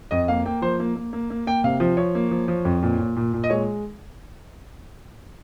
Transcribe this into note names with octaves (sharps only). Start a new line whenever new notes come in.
F2 D#5
A#3 F5
A#3 G5
F3 C5
A#3
A#3
A#3
A#3
A#3 G5
C3 F5
F3
F3 C#5
A#3
F3
F3
F2
A#2
A#2
A#2
A#2
D#5
G#3 C#5